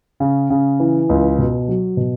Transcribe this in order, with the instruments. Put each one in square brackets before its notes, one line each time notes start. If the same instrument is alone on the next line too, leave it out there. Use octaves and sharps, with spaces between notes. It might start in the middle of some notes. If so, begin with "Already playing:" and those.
[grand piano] C#3
C#3
E3
C#2
B2
F#3
B2